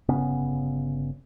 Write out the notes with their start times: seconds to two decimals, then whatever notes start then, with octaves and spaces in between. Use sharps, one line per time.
0.09 G1 C#3 B3 C#4